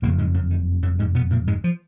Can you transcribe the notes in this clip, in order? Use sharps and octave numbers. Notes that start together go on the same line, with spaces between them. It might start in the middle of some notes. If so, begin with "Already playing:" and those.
F#1 F2 A#2 C#3 A#3
G#2 G#3
F#2 F#3
D#3
F#2 F#3
G#2 G#3
B2 B3
A#2 A#3
G#2 G#3
F3